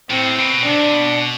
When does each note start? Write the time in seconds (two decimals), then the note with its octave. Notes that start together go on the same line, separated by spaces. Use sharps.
0.10 A2 C4
0.39 B2
0.66 C3 D4
0.94 B2